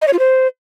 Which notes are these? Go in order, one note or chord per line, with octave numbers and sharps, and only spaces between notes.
D#5
C#5
F4
C5